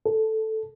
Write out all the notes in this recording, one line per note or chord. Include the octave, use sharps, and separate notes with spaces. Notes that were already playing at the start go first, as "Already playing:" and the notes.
A4